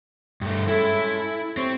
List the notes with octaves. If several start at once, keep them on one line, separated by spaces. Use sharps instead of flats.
G2 A3
G#3 C#4 E4 A4
C4 G4 C#5